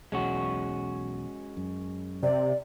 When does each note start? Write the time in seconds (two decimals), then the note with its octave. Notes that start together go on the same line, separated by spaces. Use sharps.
0.12 B1 E2 G#3 C#4 F#4
1.57 F#2
2.23 C3 D5